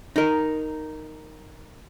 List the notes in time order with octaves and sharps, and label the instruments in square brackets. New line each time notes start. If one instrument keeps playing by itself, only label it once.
[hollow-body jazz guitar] D#4 A#4